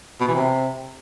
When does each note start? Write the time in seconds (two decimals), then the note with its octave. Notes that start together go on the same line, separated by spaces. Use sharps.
0.20 B2
0.28 E3
0.35 C3